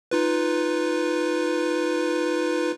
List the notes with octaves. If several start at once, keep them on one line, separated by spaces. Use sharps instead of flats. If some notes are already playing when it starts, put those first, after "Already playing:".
D#4 F4 B4